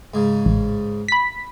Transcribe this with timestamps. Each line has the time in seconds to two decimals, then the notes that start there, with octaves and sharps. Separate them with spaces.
0.14 G#2 C#3
0.45 A1
1.08 B5 B6